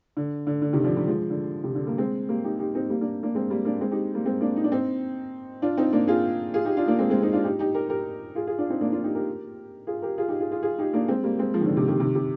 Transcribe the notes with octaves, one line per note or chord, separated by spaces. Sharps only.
D3
D3
D3
C3 D#3
D3 F3
D#3 G3
F3 G#3
D3
C3
D3
G3 A#3
G#3 C4
G3 A#3
D#4 G4
D#4 G4
C4 D#4
G3 A#3
A#3 D4
A#3 D4
G#3 C4
G3 A#3
A#3 D4
G#3 C4
D#4 G4
G3 A#3
G#3 C4
A#3 D4
D#4
D4
C4 D#4
D4 F4
C4 D#4
A#3 D4
F4 G#4
F4 G#4
D#4 G4
D4 F4
A#3 D4
G#3 C4
G#3 C4
C4 D#4
D4 F4
D#4 G4
D#4 G4
G4 A#4
G4 A#4
F4 G#4
F4 G#4
D4 F4
C4 D#4
A#3 D4
D4 F4
D#4 G4
G4 A#4
F4 G#4
G4 A#4
F4 G#4
D#4 G4
F4 G#4
F4 G#4
F4 G#4
D#4 G4
A#3 D4
G#3 C4
G3 A#3
G#3 C4
F3 G#3
D#3
D3 F3
C3 D#3
C3 D#3
C3 D#3
C3